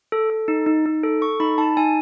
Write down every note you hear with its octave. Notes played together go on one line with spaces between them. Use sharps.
A4
A4
D#4
D#4
D#4
A4
A4 C#6
D#4 B5
D#4 A5
D#4 G#5